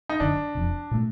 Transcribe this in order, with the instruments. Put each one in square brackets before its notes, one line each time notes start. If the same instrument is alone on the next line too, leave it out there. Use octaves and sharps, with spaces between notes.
[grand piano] D#4
[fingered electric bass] F#1 F#2 D3 [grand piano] D4
[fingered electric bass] F1 F2 C3
A#2 F3 A3